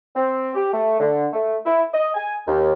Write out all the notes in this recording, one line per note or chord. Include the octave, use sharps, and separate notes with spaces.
C4
G4
A3
D3
A3
E4
D#5
G#5
D#2